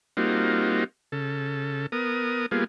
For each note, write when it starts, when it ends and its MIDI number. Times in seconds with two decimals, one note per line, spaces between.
0.17 0.84 55
0.17 0.84 58
0.17 0.84 60
0.17 0.84 63
0.17 0.84 65
0.17 0.84 66
1.12 1.86 49
1.12 1.86 69
1.92 2.46 59
1.92 2.46 70
1.92 2.46 87
2.51 2.64 55
2.51 2.64 58
2.51 2.64 59
2.51 2.64 65
2.51 2.64 68